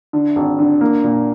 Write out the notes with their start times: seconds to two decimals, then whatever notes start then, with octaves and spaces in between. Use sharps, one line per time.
0.13 D3
0.36 G#1
0.59 D3
0.81 A#3
1.04 A#2